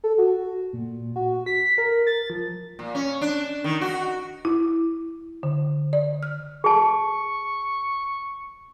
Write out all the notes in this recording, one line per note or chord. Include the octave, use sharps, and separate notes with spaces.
A4
F#4
A#2
F#4
B6
A#4
A6
F3
A#2
C#4
D4
D#3
F#4
E4
D3
D5
F6
G#4 A5 C#6